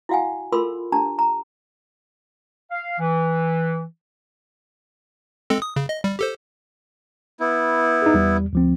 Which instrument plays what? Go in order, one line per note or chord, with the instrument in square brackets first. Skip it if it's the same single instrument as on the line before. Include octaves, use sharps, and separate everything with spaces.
[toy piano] E4 F#4 F5 F#5 G#5
F4 A4 A#4 B5 C6 E6
D4 G4 A5 A#5
A#5
[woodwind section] F5
E3
[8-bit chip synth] G#3 C4 A4
D#6
C#3
D#5
G3
G4 A4 C5
[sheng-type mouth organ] B3 E4
[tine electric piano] D#4 G#4
E2 G3
D2 F3 C4